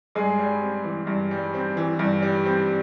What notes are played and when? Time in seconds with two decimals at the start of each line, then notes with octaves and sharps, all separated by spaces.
0.15 G2 G#3 G#4
0.39 G3
0.61 C4
0.84 E3
1.07 G2
1.31 G3
1.54 C4
1.77 E3
1.99 G2
2.22 G3
2.45 C4